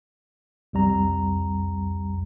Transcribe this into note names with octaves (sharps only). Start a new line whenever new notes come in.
C2 F2 G3 A#5